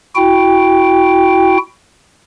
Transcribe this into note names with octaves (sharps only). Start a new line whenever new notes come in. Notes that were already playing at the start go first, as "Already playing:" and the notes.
E4 F#4 G5